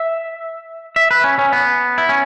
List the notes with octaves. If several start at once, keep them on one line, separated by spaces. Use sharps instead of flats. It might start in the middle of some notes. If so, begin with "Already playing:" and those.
Already playing: E5
E5
B4
C#4
C#4
B3
E4
C#4